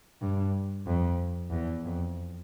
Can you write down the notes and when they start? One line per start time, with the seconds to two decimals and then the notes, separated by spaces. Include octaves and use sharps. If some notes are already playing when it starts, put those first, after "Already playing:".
0.21 G2
0.86 F2
1.51 E2
1.84 F2